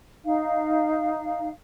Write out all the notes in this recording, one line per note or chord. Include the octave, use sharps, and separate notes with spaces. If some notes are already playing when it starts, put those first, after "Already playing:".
D#4 F5